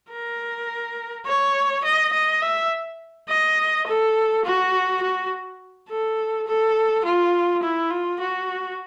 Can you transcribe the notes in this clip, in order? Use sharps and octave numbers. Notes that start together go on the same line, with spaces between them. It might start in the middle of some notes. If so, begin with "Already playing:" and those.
A#4
C#5
D#5
D#5
E5
D#5
A4
F#4
F#4
A4
A4
F4
E4
F4
F#4